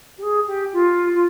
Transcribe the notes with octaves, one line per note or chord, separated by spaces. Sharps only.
G4
G#4
G4
F4
F4